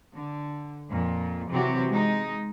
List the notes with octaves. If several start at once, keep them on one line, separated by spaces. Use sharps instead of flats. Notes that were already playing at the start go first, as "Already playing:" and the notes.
D3
F2 A#2
C3 E3 F#3 C4 F#4 G4
G#3 D#4